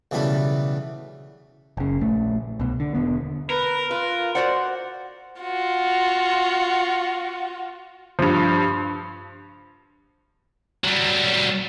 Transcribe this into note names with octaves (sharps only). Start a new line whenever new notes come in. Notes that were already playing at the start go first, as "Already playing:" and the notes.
B1 C#3 E3 G3 A3 B5
F#1 C#3
A#1 A3
C2 B2
D3
E1 D3 B3
A#4 B4
F4 B4
F#4 C5 D5 F#5
F4 F#4
G2 F3
F#3 G3